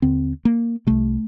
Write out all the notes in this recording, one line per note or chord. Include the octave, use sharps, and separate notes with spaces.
D#2 D3 C4
A#3
C2 C3 A3